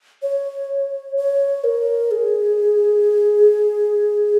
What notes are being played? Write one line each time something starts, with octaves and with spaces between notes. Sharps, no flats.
C#5
C#5
A#4
G#4